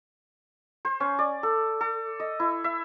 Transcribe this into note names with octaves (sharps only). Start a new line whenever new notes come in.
C5
C#4
D5
A4
A4
D#5
E4
E5